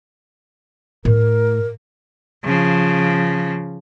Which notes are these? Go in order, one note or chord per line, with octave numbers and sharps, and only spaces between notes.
A2 A#4
C#3 F3